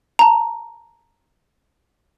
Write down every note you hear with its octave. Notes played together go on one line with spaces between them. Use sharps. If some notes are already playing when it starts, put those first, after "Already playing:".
A5 A#5